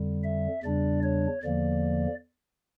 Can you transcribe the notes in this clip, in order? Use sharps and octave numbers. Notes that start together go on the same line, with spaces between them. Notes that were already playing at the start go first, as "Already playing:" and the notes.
Already playing: F2 D3 G3
E5
E2 C#3 G3 D4 D5
C#5
E2 D3 F3 A#3 D5